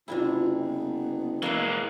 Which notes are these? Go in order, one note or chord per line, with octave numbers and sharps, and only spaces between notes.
F#1 C3 D4 E4 F4
B3
E3 G#3 A#3 E4 E5